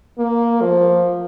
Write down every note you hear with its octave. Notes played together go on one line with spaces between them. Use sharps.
A#3
F3